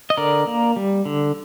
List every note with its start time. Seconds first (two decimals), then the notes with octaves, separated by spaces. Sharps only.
0.10 D#5
0.17 D3 A#4 D5
0.47 A#3
0.76 G3
1.05 D3